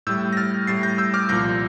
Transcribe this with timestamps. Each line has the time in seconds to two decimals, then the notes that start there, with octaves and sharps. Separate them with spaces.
0.07 A2 G3 E6 G6
0.33 A#6
0.37 F6 A6
0.67 A2 G3 A6 C7
0.83 G6 A#6
0.98 E6 G6
1.14 D6 F6
1.29 C2 A#2 F3 G6 A#6